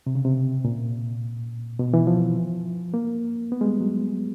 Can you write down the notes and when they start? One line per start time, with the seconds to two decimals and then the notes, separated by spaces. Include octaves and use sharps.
0.07 C3
0.15 C#3
0.25 C3
0.65 A#2
1.79 B2
1.94 E3
2.07 F3
2.94 A#3
3.52 B3
3.61 G#3
3.65 G3
3.81 F#3